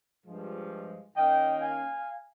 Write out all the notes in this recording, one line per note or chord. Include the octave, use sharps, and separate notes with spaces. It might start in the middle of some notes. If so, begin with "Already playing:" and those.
G2 F3 G#3
D#3 A#3 C#4 D#5 G5
F5 G#5